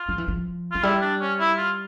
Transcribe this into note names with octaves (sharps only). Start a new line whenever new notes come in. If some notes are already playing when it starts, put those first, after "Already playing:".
Already playing: F4
F3
E3
F3
F3 F4
G3 E4
D4
C#4
E4
F4